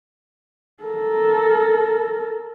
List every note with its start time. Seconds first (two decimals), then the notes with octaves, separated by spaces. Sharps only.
0.83 A4 A#4